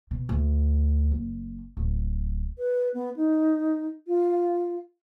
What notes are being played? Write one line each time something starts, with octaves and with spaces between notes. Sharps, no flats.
B2
D2
F#1
D1
B4
B3
D#4
F4